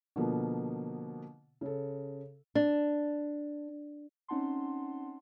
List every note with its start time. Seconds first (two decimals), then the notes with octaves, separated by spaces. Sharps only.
0.16 B2 D3 F3 A#3 B3
1.61 C#3 A4
2.55 D4
4.28 C4 C#4 D#4 F#5 A5 C6